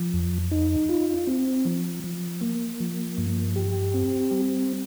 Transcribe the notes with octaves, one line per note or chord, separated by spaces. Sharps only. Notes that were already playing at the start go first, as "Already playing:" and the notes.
Already playing: F3
F2
D#4
F4
C4
F3
F3
A#3
F3
G2
G4
C4
G3